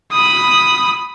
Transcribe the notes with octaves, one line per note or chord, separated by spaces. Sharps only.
B5 D#6